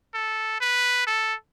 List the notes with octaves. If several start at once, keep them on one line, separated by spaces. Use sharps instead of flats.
A4
B4
A4